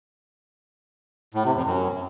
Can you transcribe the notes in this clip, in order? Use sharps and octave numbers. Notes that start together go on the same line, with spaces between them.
A2
C3
F2
F#2